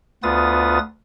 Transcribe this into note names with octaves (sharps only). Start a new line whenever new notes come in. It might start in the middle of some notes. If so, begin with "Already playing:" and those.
D2 B3 F4 B4 D#6 A6